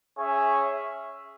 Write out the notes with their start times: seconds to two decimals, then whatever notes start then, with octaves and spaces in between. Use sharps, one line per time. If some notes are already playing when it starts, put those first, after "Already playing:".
0.16 C#4 G#4 C#5 E5